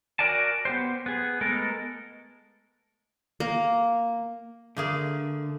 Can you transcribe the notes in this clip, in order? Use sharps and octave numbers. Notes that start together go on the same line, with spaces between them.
F#4 A#4 D5 G#5 A5
B3 G4 C5
B3 G#4
G#3 A3 B3 A4 A#4
A#3
D3 A3 A#3 G#4